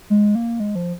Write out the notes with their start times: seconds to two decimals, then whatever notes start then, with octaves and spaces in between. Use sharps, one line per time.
0.10 G#3
0.35 A#3
0.60 G#3
0.75 F3